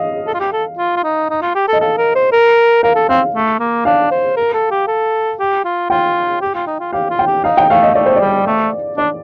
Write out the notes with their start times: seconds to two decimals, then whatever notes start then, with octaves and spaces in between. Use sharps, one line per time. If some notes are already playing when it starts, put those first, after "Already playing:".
Already playing: D#5 F5
0.27 A4
0.34 F4
0.40 G4
0.53 A4
0.78 F4
0.97 F4
1.04 D#4
1.30 D#4
1.42 F4
1.55 G4
1.68 A4
1.73 D#5
1.81 A4 F5
1.98 A#4
2.15 C5
2.33 A#4
2.83 A#4 F5
2.96 A4
3.09 C4 F5
3.35 A3
3.60 A#3
3.85 D4 F5
4.11 C5
4.37 A#4
4.54 A4
4.71 G4
4.88 A4
5.40 G4
5.65 F4
5.90 F4 G5
6.41 G4
6.55 F4
6.67 D#4
6.80 F4
6.93 G4 F5
7.10 F4
7.19 G5
7.27 G4
7.44 D#4 F5
7.57 G5
7.70 A3 F5
7.83 D#5
7.95 A3 D5
8.06 C5
8.16 G3 D5
8.47 A3
8.97 D4 D5